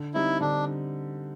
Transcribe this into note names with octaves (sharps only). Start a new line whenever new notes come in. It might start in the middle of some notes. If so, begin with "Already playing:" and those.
Already playing: D3
G3 C4 D#4 E4
D3 D4